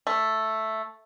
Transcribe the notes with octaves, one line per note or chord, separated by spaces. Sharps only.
A3